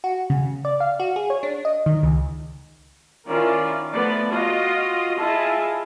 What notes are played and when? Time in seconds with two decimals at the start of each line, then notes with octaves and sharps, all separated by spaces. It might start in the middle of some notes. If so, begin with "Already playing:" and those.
0.04 F#4
0.30 C#3
0.65 D5
0.80 F5
1.00 F#4
1.16 G#4
1.30 C#5
1.43 D4
1.65 D#5
1.86 D#3
2.03 C#2
3.28 D#3 C#4 E4 F4 A#4 D5
3.90 F3 A3 B3 D5
4.32 F4 F#4 D#5
5.18 E4 F4 G#4 D#5 E5 A5